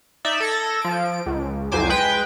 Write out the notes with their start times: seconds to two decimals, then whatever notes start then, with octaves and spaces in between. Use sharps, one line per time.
0.25 D#4 D5 E5
0.40 A4 G#6 A#6
0.82 F3 D7
1.26 C#2
1.72 C2 F2 F#3 C5 G#5 D6
1.89 G#3 B4 G5